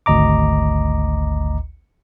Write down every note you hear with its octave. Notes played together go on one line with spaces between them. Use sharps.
G#1 D2 D#5 A#5 D6